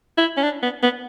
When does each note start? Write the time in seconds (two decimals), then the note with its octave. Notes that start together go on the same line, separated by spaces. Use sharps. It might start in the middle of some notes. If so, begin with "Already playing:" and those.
0.18 E4
0.37 C#4
0.43 D4
0.63 B3
0.83 B3